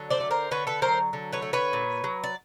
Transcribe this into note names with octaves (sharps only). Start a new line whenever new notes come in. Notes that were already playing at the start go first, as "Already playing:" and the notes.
Already playing: D3 F#3
C5 D5
A3
A#4 C5
D3 B4 C#5
A4 B4
F#3 A#4 C5
D3
B4 C#5
A3
B4 C#5
A#2
F#3
D5